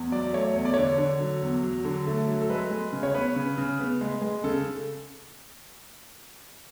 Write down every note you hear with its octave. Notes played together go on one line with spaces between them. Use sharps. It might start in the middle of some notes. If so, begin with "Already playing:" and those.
Already playing: E2
F#3 D5
A3 C#5
E2 C#5
D5
D3 C#5
D3
F#3
E2
F#3
D3
A3
F#3
A4
G#3 B4
G#3
C#3
C#5
B3 B4
C#3
C#3
B3
G#3
G#3
C#3 A4